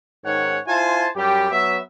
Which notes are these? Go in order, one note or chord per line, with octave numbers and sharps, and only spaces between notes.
G#2 D#3 C#4 C#5 F#5
E4 F4 C5 G#5 A5
F#2 G3 G4
F#3 B3 E5